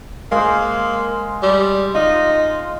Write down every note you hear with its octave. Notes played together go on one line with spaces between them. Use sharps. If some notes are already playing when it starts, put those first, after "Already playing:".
G#3 A#3 C5
G3
D#4 F4